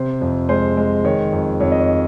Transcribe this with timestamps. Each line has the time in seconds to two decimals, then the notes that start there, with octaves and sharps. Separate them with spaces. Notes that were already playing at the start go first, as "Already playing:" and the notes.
Already playing: C3 C5
0.21 F2
0.49 G#3 C5
0.77 G#3
1.05 D#3 C#5
1.32 F2
1.60 F2 C#5
1.72 D#5
1.79 C#5